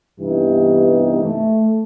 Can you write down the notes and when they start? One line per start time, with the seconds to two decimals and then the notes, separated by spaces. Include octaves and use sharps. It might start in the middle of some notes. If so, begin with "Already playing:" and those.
0.20 G2 C3 E3 B3 D#4 G4
1.22 A3